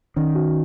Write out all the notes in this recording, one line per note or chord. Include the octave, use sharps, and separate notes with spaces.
D#3 C#4
F#4